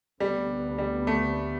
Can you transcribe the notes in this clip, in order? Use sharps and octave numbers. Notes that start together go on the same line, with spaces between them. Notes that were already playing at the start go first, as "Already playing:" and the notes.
D2 D3 G3 B3
G3
A3